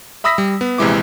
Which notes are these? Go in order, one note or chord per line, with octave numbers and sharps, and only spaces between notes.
E5 B5 D#6 E6 A#6 B6
G3
B3
A#1 C3 E3 G#3 E4 D6